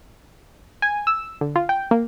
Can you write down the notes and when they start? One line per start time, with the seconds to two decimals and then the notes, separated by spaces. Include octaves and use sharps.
0.82 G#5
1.07 E6
1.41 D3
1.56 F4
1.69 G5
1.91 A#3